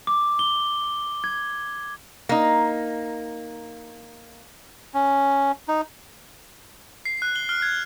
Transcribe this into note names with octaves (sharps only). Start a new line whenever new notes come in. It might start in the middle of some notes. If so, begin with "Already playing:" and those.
D6
G7
G#6
A#3 D#4
C#4
D#4
C7
F#6
G7
F6
G#6